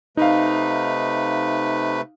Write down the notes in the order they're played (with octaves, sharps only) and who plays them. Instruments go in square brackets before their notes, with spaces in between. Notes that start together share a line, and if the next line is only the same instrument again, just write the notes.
[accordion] C3 A3 B4 [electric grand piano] D#4 F5